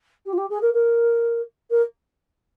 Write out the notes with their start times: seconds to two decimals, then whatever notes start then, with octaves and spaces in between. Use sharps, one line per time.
0.26 G4
0.33 F4
0.37 G4
0.50 G#4
0.62 A#4
0.74 A#4
1.70 A#4